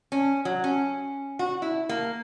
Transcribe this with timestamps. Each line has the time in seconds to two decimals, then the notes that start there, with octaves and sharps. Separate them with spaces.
0.12 C#4
0.45 F#3
0.64 C#4
1.39 F#4
1.62 E4
1.89 A#3